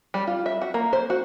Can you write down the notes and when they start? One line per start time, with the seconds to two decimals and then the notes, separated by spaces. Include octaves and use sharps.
0.14 G3
0.27 F4
0.46 E5
0.62 F#4
0.74 A#3
0.93 C5
1.10 F#4